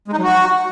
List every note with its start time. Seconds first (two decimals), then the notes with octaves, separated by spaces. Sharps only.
0.08 G#3
0.13 D#4
0.18 F#3
0.23 F#4